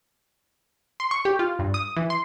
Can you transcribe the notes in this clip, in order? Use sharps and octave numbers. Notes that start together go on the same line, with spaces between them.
C6
C#6
G4
F4
G2
D#6
E3
C6